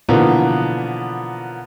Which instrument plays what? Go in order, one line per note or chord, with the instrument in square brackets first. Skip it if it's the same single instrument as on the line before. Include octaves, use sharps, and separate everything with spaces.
[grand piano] B2 D3 E3 F3 A#3 B3